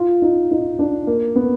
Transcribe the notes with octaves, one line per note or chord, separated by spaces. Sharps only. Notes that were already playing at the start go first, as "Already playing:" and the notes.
Already playing: F4
D#4
D#4
D4
A#3
B3